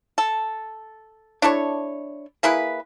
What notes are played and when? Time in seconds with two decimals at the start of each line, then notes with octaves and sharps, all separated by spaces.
0.18 A4
1.42 D4 E4 A4 C#5
2.43 A#3 E4 G#4 B4